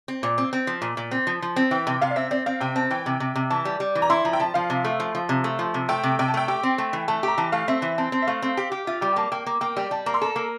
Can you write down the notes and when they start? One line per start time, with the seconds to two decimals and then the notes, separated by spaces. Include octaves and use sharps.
0.08 C4
0.23 A#2
0.38 C4
0.53 C4
0.67 F3
0.82 A#2
0.97 A#2
1.11 C4
1.27 F3
1.42 F3
1.56 C4
1.71 E3 G5
1.87 C3 G5
2.01 C3 F5
2.10 D5
2.16 C4 E5
2.31 C4 D5
2.46 C4 F5
2.60 C3 G5
2.76 C4 A5
2.91 E3 G5
3.06 C3
3.20 C3
3.36 C3
3.50 E3 A5
3.65 G3
3.80 G3
3.95 E3
4.02 A#5
4.10 E4 C6
4.25 F3 A#5
4.33 G5
4.40 F3 A5
4.54 F3 F5
4.70 C3
4.84 A3
5.00 F3
5.15 F3
5.29 C3
5.44 A3
5.59 F3
5.74 C3
5.89 A3 G5
6.03 C3
6.19 C3 G5
6.28 A5
6.34 A3 G5
6.48 G4 G5
6.63 C4
6.78 A3
6.93 E3
7.08 A3 A5
7.23 G4 A#5
7.38 E3 A5
7.52 A3 F5
7.68 C4 E5
7.82 E3
7.98 C4 A5
8.12 C4
8.22 E5
8.27 A3 F5
8.42 C4
8.57 G4
8.72 G4
8.87 F4 E5
9.01 G3 G5
9.13 G5
9.16 A#3 A5
9.32 A#3 G5
9.46 A#3
9.61 A#3 G5
9.77 G3 G5
9.91 G3 A5
10.06 A#3 A#5
10.14 C6
10.22 A4 A#5
10.36 A#3